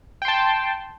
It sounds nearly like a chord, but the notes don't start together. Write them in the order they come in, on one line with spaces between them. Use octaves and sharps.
G5 C6 A5